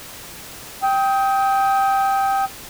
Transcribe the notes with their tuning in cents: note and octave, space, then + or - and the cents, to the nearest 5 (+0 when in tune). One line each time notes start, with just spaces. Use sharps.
G5 +0 D#6 +30